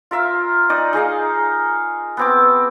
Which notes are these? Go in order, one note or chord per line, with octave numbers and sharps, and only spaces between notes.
F4 A#4 E5 F5
D#4 D5 D#6
D#4 G#4 D#5 F5
B3 C4 D6